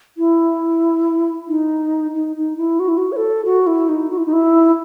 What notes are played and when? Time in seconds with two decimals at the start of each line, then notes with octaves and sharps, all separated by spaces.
0.17 E4
1.48 D#4
2.14 D#4
2.36 D#4
2.57 E4
2.79 F#4
2.88 E4
2.97 F#4
3.12 C#5
3.16 A4
3.45 F#4
3.67 E4
3.89 D#4
4.11 F#4
4.18 E4
4.26 D#4
4.33 E4